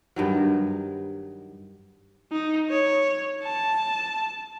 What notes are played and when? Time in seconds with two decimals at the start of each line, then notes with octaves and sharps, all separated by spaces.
0.16 G2 D#3 F#3
2.32 D#4
2.70 C#5
3.43 A5